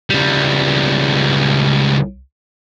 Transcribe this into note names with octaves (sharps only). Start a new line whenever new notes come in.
C#2 G3